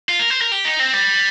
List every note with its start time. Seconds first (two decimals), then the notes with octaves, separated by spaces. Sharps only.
0.09 F4
0.19 A#4
0.30 C5
0.41 A#4
0.52 G4
0.65 D#4
0.80 C4
0.93 G3